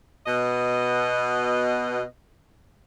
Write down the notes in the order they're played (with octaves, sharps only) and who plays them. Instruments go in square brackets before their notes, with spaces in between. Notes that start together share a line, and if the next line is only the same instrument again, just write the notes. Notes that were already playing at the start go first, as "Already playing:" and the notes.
[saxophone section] B2 D#5